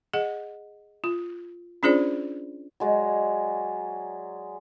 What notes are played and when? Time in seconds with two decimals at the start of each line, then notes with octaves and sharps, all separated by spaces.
0.13 G#4 D#5 F#5
1.04 F4
1.83 C#4 D4 F4 G#4 C5 D5
2.80 F#3 G#3 D5